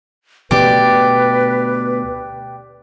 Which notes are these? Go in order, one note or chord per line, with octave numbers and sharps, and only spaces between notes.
D2 B2 A3 G4 B4 D5